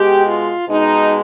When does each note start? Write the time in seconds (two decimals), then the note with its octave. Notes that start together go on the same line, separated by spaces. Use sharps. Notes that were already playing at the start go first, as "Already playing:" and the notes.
Already playing: B2 G#3 G4
0.27 F4
0.69 B2 G#3 D#4